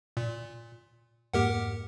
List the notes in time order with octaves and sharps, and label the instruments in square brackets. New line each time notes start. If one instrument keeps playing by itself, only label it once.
[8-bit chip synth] A#2
[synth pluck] F2 G#2 A#3 [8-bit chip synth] G4 A#4 F#5